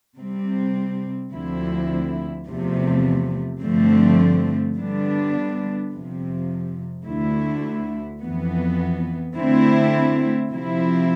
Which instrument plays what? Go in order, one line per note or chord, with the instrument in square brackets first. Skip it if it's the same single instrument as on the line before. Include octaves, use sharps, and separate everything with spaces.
[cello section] C3 G3 C4
D2 D3 F3 C4 E4
E2 C3 F3 A3
G2 D3 F3 A3 C4
D3 G3 B3 D4
F2 C3 F3
D2 D3 A3 E4
F2 E3 B3
D3 A3 C4 E4
C3 F3 C4 E4